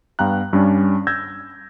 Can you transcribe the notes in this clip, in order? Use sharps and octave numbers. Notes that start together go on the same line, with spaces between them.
G2 B3 F5 G5 A#5 F#6
G2 G3 C#4 D4
E6 G6 G#6 A#6